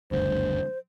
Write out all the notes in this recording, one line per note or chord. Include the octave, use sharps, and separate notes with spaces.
F#1 D2 G2 C5